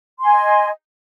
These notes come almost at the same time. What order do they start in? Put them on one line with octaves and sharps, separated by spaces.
C6 G#5 D#5